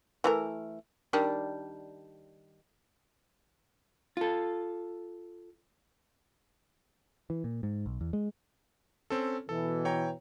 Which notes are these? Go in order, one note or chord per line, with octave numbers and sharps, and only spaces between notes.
E3 A3 A#4
D#3 G3 D4
F4 A4
E3
A#2
G#2
B1
E2
G#3
C4 C#4 A4
B2 E3 A4
C#5 G5 A#5